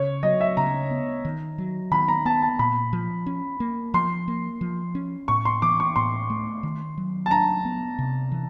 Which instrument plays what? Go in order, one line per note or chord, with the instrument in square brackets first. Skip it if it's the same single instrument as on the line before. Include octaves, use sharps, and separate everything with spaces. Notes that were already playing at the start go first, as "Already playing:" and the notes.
Already playing: [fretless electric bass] C#3 [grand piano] C#5
[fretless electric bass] F#3 [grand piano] D#5
[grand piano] E5
[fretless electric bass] C#3 [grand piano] A#5
[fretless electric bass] B3
D#3
F#3
[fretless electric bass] D#3 [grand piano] B5
[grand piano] A#5
[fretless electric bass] B3 [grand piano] A5
[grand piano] A5
[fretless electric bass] A#2 [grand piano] B5
[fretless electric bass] F3
C#4
A#3
[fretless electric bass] F3 [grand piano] C6
[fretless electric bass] A#3
F3
C#4
[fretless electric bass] A2 [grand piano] C#6
[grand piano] C6
[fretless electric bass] E3 [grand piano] D6
[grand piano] C#6
[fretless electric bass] A2 [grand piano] C6
[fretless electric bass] A3
D#3
F#3
[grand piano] A5
[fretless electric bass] D4 [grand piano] A#5
[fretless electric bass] B3
C3
E3